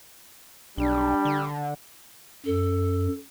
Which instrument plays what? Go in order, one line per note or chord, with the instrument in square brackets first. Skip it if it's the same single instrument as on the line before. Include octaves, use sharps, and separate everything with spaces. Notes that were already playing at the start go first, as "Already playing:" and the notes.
[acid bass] B1 [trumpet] G3 [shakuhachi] D4
[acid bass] D3
[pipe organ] F#2 [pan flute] A4